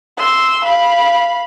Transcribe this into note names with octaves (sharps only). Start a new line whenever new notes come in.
C6 E6
F5 B5